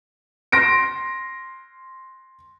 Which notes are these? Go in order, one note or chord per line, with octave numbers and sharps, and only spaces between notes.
C6 A#6 D7